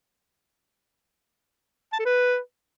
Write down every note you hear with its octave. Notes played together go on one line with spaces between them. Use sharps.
A5
A4
B4